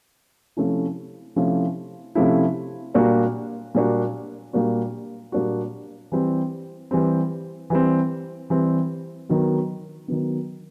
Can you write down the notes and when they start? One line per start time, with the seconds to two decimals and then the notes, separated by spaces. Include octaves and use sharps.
0.57 C3 F3 A3 C#4 E4
1.36 C3 F3 A3 C#4 E4
2.15 C3 F3 A3 C#4 E4
2.94 A#2 G3 A#3 D4 F#4
3.75 A#2 G3 A#3 D4 F#4
4.53 A#2 G3 A#3 D4 F#4
5.32 A#2 G3 A#3 D4 F#4
6.12 E3 G3 C4
6.91 E3 G3 C4
7.70 E3 G3 C4
8.50 E3 G3 C4
9.29 D#3 F#3 B3
10.08 D#3 F#3 B3